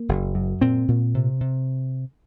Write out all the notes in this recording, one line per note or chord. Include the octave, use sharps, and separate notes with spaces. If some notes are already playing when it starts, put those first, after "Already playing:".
Already playing: A#3
F#1
F#2
A#2 C4
A#2
C3
C3